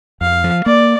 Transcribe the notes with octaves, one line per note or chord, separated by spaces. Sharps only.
F2 F5
F3
A#3 D5